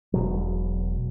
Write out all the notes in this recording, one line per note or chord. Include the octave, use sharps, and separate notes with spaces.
E1 B2 F#3